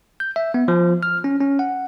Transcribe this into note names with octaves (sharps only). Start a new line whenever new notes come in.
G6
E5
B3
F3
F6
C#4
C#4
F#5